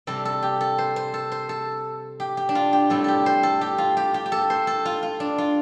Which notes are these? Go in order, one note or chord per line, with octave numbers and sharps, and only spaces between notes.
C3 G3 C4 A4
A4
G4
A4
C5
C5
A4
C5
A4
G4
G4
D4
F4
G4
A2 G3 C4 A4
G4 A4
C5
A4
G4
F4
G4
G4
G4
A4
C5
A4
F4
F4
D4
F4